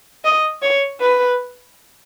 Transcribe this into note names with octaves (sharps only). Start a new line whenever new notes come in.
D#5
C#5
B4